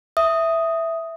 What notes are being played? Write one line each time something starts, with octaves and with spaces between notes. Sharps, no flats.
E5 D#6